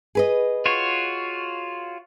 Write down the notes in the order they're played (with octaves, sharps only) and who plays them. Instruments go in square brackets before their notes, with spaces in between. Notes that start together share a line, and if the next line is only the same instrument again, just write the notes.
[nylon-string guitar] G#4 B4 D#5
[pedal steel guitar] F4 F#4 C#5